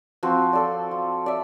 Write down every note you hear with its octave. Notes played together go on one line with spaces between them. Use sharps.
F3 C4 F#4
A4 D5
F4
D5 E5